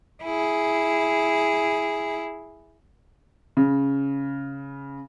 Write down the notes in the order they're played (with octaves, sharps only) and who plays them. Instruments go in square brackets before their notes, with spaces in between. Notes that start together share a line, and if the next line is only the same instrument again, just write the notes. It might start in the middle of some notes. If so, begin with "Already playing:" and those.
[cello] E4 G#4
[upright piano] C#3